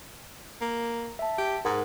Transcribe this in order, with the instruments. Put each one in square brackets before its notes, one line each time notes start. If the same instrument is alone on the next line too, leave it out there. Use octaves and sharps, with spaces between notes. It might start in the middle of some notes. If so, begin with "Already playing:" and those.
[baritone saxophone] A#3
[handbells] E5 A5
[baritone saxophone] G4
[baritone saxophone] G#2 [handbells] A#4 F#5